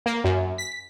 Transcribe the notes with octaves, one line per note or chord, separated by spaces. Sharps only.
A#3
F#2
B6